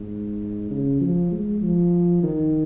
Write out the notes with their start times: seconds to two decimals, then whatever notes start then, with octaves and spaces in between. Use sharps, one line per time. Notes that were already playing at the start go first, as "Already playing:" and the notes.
Already playing: G#2
0.71 C#3
1.01 F3
1.32 G#3
1.62 F3
2.23 D#3